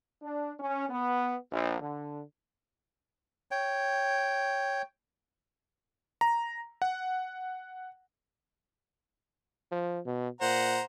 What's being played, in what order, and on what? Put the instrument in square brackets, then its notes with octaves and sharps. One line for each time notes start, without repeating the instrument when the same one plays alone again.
[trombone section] D4
C#4
B3
A#1
D3
[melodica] C#5 G5
[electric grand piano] A#5
F#5
[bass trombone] F3
B2
[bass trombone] A#2 [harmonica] C5 F#5 A#5